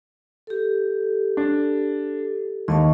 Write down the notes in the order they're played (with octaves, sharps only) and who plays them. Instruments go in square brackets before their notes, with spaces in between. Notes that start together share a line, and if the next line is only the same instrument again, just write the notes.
[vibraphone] G4 A4
[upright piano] D4
[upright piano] D#2 [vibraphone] D#5 A5 C#6